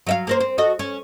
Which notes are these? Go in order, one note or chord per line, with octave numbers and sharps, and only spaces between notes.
F#3 E5 F5
A#3 A#4 C5
C4
F#4 A4 D#5
C#4